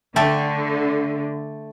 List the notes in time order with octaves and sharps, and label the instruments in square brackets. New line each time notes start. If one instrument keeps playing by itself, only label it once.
[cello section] D3 [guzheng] A3 [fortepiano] E5 G5 A5